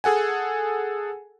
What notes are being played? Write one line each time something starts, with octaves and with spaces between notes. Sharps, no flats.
G#4 A4 F#5 G#5